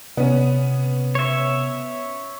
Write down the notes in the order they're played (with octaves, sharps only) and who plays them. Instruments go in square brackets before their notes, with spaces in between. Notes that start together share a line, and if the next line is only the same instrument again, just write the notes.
[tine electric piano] C3 [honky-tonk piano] B3 C#4
[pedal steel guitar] C#5 E5